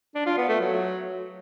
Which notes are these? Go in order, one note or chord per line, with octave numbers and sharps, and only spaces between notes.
D4
F4
B3
A3
F#3